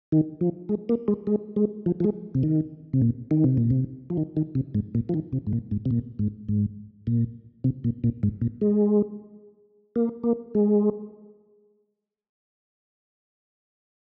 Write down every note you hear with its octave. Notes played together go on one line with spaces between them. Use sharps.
D#3
F3
G#3
A#3
G#3
G#3
G#3
F3
F3
G#3
C3
D#3
C3
A#2
D#3
C3
A#2
C3
F3
D#3
D#3
C3
G#2
A#2
F3
D#3
C3
G#2
A#2
G#2
C3
A#2
G#2
G#2
A#2
C3
A#2
A#2
G#2
A#2
G#3
A#3
A#3
G#3